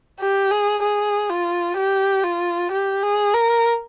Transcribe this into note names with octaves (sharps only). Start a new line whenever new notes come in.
G4
G#4
G#4
F4
G4
F4
G4
G#4
A#4